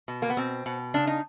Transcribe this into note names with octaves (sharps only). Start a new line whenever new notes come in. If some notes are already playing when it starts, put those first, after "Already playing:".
B2
A#3
B3
B2 C4
B2
C#3 D4
D#4